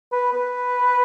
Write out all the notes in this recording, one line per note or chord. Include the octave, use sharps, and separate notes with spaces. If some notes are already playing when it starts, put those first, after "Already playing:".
B4
B4